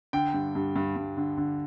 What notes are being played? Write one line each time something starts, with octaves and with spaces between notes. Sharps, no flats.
D3 G5
G2
G2
G2
G2
D3
D3